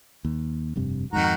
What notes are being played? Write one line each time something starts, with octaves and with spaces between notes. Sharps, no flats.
D#2
F1 G2 C3
F2 G#2 D#3 F#4 A#5